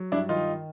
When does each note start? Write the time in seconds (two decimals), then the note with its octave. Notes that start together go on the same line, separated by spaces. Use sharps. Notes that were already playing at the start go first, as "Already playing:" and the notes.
Already playing: F#3
0.12 G2 D4 E4
0.29 D#3 D#4 F4